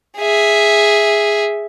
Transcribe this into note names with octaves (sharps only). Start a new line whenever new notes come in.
G#4 E5